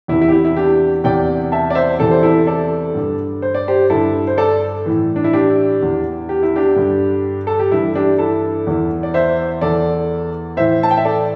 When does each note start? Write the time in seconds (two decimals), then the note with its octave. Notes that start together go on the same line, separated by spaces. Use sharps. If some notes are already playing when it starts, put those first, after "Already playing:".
0.08 E2 C3 E3 E4
0.21 E4
0.28 G4
0.32 E4
0.45 E4
0.57 D4 G4
1.04 E2 C3 E3 D5 G5
1.52 E5 A5
1.70 D5
1.75 C5 E5
1.99 E2 C3 E3 A4 D5
2.11 C5
2.23 E4 A4
2.47 A4 D5
2.94 G2 D3
3.42 C5
3.55 D5
3.68 G4 C5
3.90 G2 D3 E4 A4
4.27 C5
4.38 A4 D5
4.86 A2 E3
5.16 D4
5.24 E4
5.33 D4 G4
5.80 E2 E3
6.29 G4
6.43 E4
6.56 D4 G4
6.76 G2 D3
7.47 A4
7.59 G4
7.72 G2 E3 E4
7.95 D4 G4
8.18 E4 A4
8.67 E2 E3
9.03 D5
9.14 C5 E5
9.61 E2 E3 A4 D5
10.57 A2 E3 C5 E5
10.83 A5
10.91 G5
10.97 E5
11.05 A4 D5